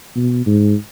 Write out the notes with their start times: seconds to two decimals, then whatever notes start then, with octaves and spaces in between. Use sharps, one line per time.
0.15 B2
0.46 G#2